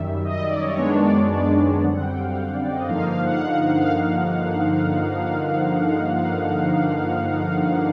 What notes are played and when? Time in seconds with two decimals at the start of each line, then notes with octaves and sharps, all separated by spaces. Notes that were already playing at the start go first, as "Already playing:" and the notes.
Already playing: F#2 D#3 G3 E5
0.25 D#5
0.42 D5
0.61 C#5
0.78 F#2 D#3 G#3 B3 D4 C#5
0.95 D5
1.13 C#5
1.30 D5
1.83 F#2 D3 G3 C4 F#5
2.01 G5
2.19 F5
2.54 D5
2.71 D#5
2.89 G2 D3 F3 A#3 D#4 F5
3.07 F5
3.25 F#5
3.42 F#5
3.60 F#5
3.78 F5